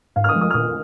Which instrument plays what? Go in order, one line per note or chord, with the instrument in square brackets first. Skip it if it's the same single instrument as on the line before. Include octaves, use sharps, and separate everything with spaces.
[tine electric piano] G#2 [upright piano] F5
[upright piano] F6
D#6
[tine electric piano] F3 G#3
[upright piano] D#6
F6
[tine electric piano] A#2 [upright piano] D#6